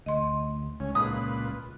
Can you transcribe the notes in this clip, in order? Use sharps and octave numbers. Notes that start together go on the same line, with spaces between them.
D2 D#5 C6
C#2 C#4
A#2 B4 D#6